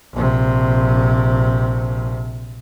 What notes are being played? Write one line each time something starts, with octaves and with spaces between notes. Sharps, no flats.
A#1 C3